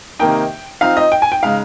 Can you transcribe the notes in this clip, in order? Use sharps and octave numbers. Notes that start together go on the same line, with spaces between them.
C3 D#3 A#3 D#4 G5
F3 C4 D#4 F5
D#5
G5
G#5
G5
C#3 G#3 D#4 F5